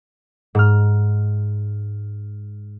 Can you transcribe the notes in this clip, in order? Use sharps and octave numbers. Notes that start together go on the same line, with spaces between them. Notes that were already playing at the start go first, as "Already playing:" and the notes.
G#2 F6